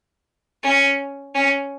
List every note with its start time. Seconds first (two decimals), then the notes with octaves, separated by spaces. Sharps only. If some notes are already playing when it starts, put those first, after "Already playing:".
0.63 C#4
1.34 C#4